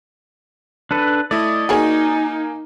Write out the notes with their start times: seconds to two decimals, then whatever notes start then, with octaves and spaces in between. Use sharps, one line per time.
0.91 D4 A4 B4
1.31 A3 E4 D5 D#5
1.69 A#3 D#4 F#4 G#4 C#5 G#5